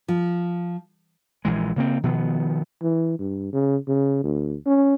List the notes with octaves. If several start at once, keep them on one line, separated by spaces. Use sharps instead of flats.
F3
A#1 E3 G#3
C#3 A#3 C4
B2 D#3 F3 B3
E3
G2
C#3
C#3
D2
C#4